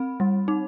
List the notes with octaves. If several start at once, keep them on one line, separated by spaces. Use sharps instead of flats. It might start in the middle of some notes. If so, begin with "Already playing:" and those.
Already playing: C4 B5
G3
D#4